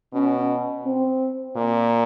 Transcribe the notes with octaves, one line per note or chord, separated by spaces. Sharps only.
B2 C#4
C4
A#2